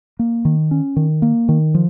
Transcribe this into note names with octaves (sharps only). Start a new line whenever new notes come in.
A#3
D#3
C#4
D#3
A#3
D#3
F3